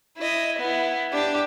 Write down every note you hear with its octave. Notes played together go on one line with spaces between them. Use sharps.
E4 D#5
B3 E4
D4 G4